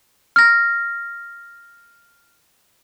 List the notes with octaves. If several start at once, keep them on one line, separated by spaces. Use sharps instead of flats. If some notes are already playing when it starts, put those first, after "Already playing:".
F6 A#6